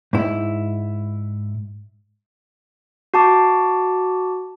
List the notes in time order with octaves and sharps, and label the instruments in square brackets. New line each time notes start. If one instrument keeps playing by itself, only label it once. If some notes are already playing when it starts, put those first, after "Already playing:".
[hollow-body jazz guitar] G#2 E4
[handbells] F#4 A5 D6